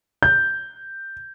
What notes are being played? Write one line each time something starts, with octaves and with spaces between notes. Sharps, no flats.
G6